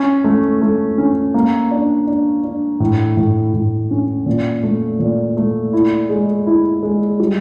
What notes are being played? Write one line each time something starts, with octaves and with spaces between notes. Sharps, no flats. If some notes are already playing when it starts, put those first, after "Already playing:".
Already playing: C#4
A3
A3
C#4
A#3
D4
D4
D4
A2
A2
A2
C#4
A#2
A3
A#2
A3
E4
G#3
E4
G#3
G3